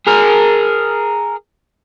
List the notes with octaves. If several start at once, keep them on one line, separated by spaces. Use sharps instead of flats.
G#4 A#4